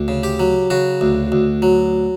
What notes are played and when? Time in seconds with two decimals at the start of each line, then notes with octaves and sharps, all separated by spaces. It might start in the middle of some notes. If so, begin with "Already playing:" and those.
Already playing: D2
0.08 C#3
0.23 G4
0.40 F#3
0.70 C#3 F#4
1.01 D2
1.32 D2
1.62 F#3